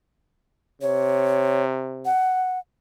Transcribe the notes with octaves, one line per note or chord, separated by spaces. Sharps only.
C3 C#5
F#5